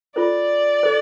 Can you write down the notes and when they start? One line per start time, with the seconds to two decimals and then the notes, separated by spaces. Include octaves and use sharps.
0.16 F4 A4 C5 D5
0.83 A4 C5